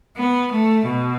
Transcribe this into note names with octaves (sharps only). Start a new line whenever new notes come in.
B3
A3
B2